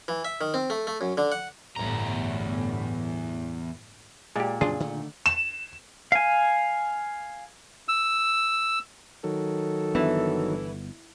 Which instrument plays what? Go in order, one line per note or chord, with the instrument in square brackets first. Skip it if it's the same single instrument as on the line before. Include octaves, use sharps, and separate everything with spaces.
[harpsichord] E3
E5
D#3
C4
A3
A3
F#2
D3
F#5
[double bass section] G1 A2 [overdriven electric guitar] E2 A#5
[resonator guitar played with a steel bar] A#2 [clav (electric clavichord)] G#3 G4
[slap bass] F2 C#3 F#3 [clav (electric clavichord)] D4 F4 G#4
[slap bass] D3 D#3 A3
[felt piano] E7
[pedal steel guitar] F5 G#5
[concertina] E6
[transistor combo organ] D#3 F#3 [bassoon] A4
[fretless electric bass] G1 B3 D4 [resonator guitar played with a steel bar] E3